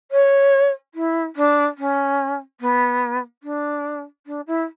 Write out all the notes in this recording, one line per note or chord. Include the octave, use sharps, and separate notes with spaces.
C#5
E4
D4
C#4
B3
D4
D4
E4